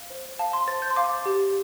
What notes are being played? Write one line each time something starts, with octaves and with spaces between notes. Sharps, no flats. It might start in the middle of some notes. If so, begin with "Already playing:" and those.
Already playing: F5
C5
F5 A5
C6
C5 A6
G6
C6
F5 D6
G4